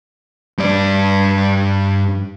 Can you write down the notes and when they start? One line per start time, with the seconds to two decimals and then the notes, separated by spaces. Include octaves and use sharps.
0.58 G2 D5